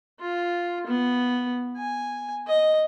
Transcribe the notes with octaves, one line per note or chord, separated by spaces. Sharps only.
F4
B3
G#5
D#5